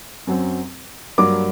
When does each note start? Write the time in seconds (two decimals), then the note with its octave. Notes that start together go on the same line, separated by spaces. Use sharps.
0.27 F#2 F#3 C4
1.18 G2 F#3 A#3 D6